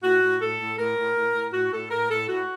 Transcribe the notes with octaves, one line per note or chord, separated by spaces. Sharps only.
A2 F#4
A2
A2 A4
A2
A2 A#4
A2
A2
A2
A2 F#4
A2 A4
A2 A#4
A2 A4
A2 F#4